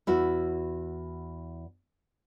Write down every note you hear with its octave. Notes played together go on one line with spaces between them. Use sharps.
E2 E4 F#4